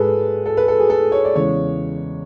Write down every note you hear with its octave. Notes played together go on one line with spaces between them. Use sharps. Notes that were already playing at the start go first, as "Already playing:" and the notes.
Already playing: G#2 G#3 G#4 A4 B4
A4
B4
A4
G#4
A4
C#5
D5
E2 C#3 G#3 C#5